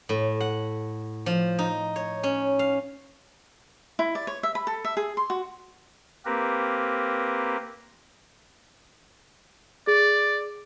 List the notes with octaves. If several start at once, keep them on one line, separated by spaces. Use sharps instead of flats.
A2
F#5
F3
D#4
C#5
C#4
F5
E4
D5
C#5
E5
B5
A4
E5
G#4
C6
F#4
A#3 C4 G4 A#4 B4
G#4 D5